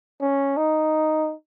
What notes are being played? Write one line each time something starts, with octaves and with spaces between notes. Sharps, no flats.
C#4
D#4